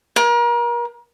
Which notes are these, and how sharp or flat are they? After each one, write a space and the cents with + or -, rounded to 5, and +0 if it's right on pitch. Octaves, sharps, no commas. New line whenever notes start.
A#4 +35